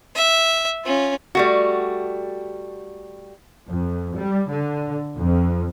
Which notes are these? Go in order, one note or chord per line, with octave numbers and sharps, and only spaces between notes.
E5
C#4 F4
G3 A3 F#4
F2
G3
D3
F2